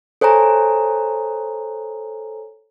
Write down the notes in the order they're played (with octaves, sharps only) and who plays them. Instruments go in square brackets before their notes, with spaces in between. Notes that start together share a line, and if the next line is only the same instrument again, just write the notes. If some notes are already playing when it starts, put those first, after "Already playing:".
[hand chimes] A4 C5 C#5 G#5 A#5